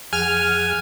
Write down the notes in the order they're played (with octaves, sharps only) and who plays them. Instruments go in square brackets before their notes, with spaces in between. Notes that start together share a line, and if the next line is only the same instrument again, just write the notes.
[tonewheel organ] F2 G#4 F#5 [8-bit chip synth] G#5 [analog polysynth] F6